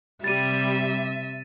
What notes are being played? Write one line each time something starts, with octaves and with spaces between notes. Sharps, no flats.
C3 G3 E5 A6 D#7